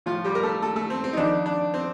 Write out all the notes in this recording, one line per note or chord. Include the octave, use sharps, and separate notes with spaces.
A2 F3 F4
G3 G4
A#4
A3 A4
A3 A4
A3 A4
C4
C4
D#4
F2 D#3 D4
D4
C4